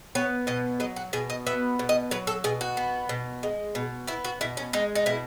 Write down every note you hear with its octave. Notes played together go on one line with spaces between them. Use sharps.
B3 C#5
B2 D#5
F#3 D#5
F#4
B2 G#4
D#5
B3 E5
B2
D#5
F#3 B4
A4
B2 G#4
F#4
B3
B2
G#3
B2
B3 E4
F#4
B2 E4
C#4
G#3 D#4
D#4
B2 E4